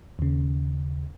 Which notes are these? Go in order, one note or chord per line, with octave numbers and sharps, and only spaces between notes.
D#2 C#3